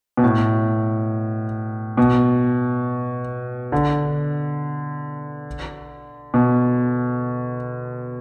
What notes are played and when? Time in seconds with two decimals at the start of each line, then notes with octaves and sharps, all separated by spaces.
0.17 B2
0.23 A2
1.97 B2
3.72 D3
6.34 B2